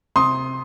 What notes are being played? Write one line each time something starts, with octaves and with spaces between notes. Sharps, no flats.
C3 C6 D#6